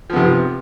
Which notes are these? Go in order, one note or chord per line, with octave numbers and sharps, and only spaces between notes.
C3 F3 B3